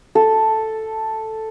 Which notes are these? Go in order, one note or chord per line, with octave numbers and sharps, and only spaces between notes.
A4